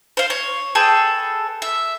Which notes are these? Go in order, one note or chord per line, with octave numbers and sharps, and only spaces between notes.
C5 F5
C#5
G#4 A4 B4 G5
E5